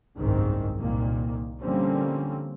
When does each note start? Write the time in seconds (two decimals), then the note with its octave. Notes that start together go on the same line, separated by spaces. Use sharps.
0.19 F#1 C2 G#2 D#3 C4
0.78 C2 A#2 D#3 A#3
1.61 D3 F3 G3 A#3 C4 C#4